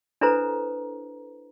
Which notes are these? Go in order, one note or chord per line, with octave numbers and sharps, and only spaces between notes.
D4 E4 A4 B4 C5 A#5